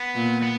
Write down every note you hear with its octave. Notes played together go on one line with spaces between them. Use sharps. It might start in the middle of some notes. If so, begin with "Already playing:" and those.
Already playing: B3
A#2
B3